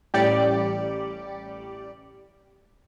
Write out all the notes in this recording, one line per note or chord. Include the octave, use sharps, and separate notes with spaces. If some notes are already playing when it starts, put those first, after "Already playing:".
A1 G3 G4 D5 C#7 D7